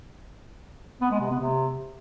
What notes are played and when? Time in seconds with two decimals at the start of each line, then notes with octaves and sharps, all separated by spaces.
1.01 B3
1.11 G#3
1.21 C3
1.30 B3
1.40 C3